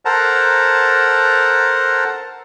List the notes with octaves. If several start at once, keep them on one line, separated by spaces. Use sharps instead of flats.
A4 A#4 C5 F#5 A5 A#5